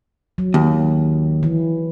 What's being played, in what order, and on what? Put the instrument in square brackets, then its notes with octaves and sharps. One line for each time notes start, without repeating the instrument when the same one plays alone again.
[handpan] F#3
[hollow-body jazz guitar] D#2
[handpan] E3